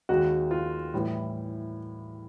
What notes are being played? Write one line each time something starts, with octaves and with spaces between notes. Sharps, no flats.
D#2 D#3 G#3 F#4
F4
A2 E3 G3